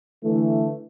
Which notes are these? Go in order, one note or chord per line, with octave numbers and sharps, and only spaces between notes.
D3 E3 A3